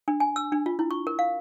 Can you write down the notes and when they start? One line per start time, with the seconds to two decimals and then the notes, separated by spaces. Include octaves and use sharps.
0.08 D4
0.20 G#5
0.36 E6
0.52 D4
0.66 F4
0.79 E4
0.91 C#6
1.07 A#4
1.19 F5